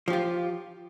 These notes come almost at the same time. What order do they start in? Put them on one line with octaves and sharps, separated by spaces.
F3 G4 F4